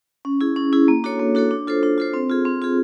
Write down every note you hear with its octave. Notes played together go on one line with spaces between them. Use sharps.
C#4
E4 G#4
C#4
E4 G#4
A#3
D4 F#4 A4 C#5
A#3
D4 F#4 A4 C#5
D4
F4 A4 C5
D4
F4 A4 C5
C4
F4 G#4
C4
F4 G#4